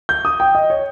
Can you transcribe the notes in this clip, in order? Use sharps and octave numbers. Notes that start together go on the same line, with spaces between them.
G6
D#6
G5
D#5
C#5